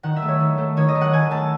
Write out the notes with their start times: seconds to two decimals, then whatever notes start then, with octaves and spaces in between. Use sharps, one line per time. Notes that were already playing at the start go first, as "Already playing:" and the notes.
0.03 D#3 F#5
0.16 E5
0.22 A3
0.28 C#5
0.40 D#3
0.58 A3
0.77 D#3 C#5
0.88 D#5
0.95 A3
1.01 F#5
1.13 D#3 G#5
1.31 A3 A5